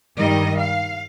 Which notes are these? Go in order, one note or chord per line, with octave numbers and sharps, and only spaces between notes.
G2 D#3 G3 D#5
F5